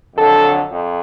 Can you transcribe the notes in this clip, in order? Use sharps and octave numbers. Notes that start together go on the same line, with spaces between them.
F2 D3 F#3 A4
F2